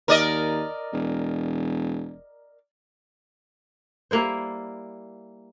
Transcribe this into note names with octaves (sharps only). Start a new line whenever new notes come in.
D#2 A#4 D5 D#5
E1
G3 A#3 E4 C5